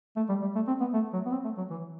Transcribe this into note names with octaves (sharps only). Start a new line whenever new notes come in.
A3
G3
G3
A3
C4
B3
A3
F#3
B3
C4
A3
F#3
E3